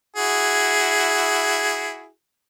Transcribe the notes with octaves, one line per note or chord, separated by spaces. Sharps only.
E4 F#4 G#4